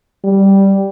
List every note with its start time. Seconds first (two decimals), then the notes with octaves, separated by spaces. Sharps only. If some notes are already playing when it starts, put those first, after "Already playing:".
0.24 G3